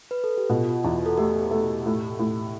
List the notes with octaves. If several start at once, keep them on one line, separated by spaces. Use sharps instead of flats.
B4
A4
G4
B2 F4
E2
A4
A3 G4
A3
A2
A2